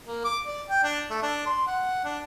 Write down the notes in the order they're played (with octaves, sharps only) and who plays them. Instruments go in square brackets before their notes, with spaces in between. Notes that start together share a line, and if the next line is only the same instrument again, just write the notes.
[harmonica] A#3
D6
D5
G5
D4
A3
D4
C6
F#5
D4